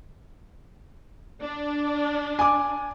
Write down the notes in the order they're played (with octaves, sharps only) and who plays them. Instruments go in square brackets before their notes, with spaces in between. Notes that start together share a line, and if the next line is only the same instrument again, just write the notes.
[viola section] D4
[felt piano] G#5 D6